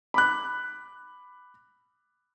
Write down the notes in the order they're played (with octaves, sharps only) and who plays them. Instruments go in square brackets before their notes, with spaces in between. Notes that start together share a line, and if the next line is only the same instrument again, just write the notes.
[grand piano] B5 D6 F#6